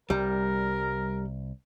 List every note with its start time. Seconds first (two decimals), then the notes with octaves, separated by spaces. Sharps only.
0.10 C2 G3 A#4